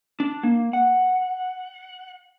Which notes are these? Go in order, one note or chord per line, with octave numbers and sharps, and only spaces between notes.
D4
A#3
F#5